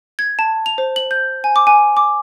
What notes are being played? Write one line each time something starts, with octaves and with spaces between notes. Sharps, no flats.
G#6
A5
F7
C5
F#7
G6
G#5
D6
G#5
D6